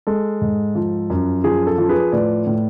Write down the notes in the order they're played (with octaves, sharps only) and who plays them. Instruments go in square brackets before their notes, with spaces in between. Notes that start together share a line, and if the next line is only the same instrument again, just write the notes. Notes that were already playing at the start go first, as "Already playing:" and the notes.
[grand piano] G#3 A4
G#2
F3
F#2
F3 G#4
A4
F3
G#4 B4
A2 B4 D5
A2